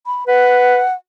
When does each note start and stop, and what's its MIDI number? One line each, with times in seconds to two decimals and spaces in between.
0.06 0.24 83
0.27 0.82 71
0.27 0.94 78